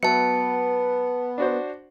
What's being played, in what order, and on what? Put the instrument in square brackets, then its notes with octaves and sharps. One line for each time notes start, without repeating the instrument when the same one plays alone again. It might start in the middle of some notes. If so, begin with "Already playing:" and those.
[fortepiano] F#3 B4 E5 [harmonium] B3 [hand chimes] A5 C#7
[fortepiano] D4 F#4 C5